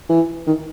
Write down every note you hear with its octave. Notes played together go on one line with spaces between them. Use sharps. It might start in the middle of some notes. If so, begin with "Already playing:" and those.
E3
D#3